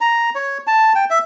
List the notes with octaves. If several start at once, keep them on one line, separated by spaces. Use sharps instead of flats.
A#5
C#5
A5
G5
E5